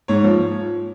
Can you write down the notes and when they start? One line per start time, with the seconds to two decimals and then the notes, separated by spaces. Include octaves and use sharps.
0.08 G#2 C#5
0.24 F3